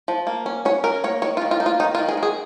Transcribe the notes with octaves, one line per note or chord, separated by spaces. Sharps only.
F3
A#3
C#4
C#4 C#5
C#4 A#4
A#3 C#5
D#3 C#5
F4
D#3
F4
A#3 D#4
F4
D#3 D#4
F4
D#3
G#4
D#3
G#4